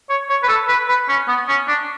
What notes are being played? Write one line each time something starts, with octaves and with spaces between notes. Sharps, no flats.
C#5
C#5
B4
A4
B4
B4
C#4
B3
C#4
D4